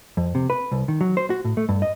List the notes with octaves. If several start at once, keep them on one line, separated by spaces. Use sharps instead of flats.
F2
C3
B4
C2
D#3
F#3
C5
F#4
A2
A3
G2
D#5